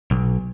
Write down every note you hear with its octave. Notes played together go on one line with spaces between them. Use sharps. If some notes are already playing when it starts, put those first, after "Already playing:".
B1